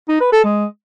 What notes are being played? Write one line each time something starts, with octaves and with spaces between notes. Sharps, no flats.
D#4
B4
A4
G#3